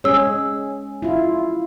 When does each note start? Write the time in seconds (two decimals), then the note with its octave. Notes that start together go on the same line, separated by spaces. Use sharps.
0.04 G#3 C#4 G#4 C#5 E6
1.02 E4 F4